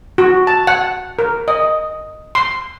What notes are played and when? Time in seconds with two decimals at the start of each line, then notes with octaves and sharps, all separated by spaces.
0.18 F#4
0.47 A5
0.67 F#5
1.19 A#4
1.48 D#5
2.35 C6